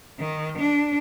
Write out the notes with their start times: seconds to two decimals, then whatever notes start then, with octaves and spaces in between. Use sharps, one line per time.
0.19 D#3
0.58 D4